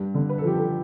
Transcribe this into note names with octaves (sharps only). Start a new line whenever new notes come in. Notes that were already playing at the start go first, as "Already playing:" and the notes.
Already playing: G2
D3
B4
A4
F3 G4
A4